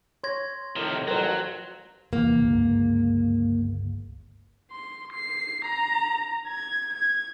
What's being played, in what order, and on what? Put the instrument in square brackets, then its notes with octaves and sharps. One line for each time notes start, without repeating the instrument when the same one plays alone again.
[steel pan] C#5 [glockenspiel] C6 G#6 A#6
[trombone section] A2 D#3 [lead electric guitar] C3 F3
[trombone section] A1 [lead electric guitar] F#3 [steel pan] A#4 C5
[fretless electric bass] F1 E2 [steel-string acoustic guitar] A#3
[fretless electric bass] G1 C#2 G#2
[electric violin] C6
C7
A#5
G#6
G#6